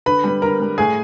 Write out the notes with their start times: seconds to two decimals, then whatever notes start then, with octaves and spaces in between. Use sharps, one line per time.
0.06 D3 B4 B5
0.24 G3 B3
0.42 D3 A#4 A#5
0.60 G3 B3
0.78 A2 G#4 G#5